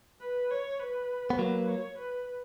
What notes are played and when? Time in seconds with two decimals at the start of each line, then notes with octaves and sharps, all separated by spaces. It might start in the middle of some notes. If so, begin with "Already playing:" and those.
0.21 B4
0.51 C#5
0.80 B4
1.30 B3
1.39 F#3 A#3 B4
1.68 C#5
1.98 B4